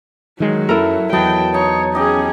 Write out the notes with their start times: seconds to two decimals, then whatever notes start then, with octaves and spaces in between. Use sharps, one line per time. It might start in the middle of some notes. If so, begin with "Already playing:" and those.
0.40 D#3 F#3 G#3
0.69 F#2 E4 A4 A#4
1.13 E2 F#3 B4 D#5 G5 A5
1.54 D#4 C#5
1.95 C#4 G4 G#4 D#5